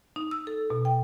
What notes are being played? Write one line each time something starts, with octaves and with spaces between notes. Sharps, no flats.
D#4
E6
A4
B2
G5